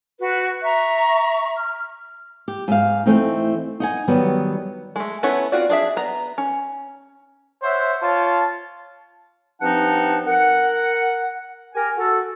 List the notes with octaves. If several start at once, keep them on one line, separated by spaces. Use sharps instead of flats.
F#4 B4
E5 A#5 C#6
F6
G4
G#2 F5
E3 A3 C4 D#4
D#4 F#5 G#5
D#3 F#3 G3 B3
G#3 A3
B3 C#4 E4 A4 C#5
C4 F4 F#4 D5
D4 G#4 E5
B3 A#5
C#4
C5 C#5 E5 F#5
F4 C#5 A5
G2 F3 C4 D#4 F#5 A5
A#4 F#5
G4 A#4 G#5
F#4 A4